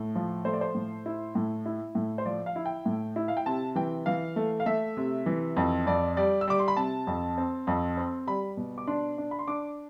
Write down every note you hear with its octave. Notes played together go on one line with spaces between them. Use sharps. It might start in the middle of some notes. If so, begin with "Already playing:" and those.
Already playing: A2
F3
A3 C5
D5
C5
A2
E4
A2
E4
A2
C5
F3 D5
F5
E4
G5
A2
E4
F5
G5
C3 A5
E3 G5
E3 F5
A3
F5
A3 E5
C3
E3
F2
F2 D5
G3 D5
E6
G3 D6
C6
B5
C3 A5
F2
C4
F2
C4
G3 B5
B2
D6
D4 C6
D4
B5
C6
D4 D6